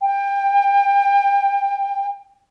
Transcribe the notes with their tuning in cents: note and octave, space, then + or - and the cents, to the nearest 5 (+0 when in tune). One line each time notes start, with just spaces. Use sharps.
G5 +25